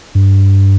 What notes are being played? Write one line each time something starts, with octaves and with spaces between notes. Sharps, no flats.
G2